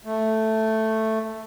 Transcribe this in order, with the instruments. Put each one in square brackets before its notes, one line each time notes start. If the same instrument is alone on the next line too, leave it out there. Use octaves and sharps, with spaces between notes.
[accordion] A3